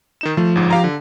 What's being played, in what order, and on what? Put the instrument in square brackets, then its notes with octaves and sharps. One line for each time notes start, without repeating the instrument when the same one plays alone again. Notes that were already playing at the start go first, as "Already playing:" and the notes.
[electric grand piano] D#3 D#4 E7
[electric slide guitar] F3 [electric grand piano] A3
[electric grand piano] G1 G#2
G4 F5 A#5
D3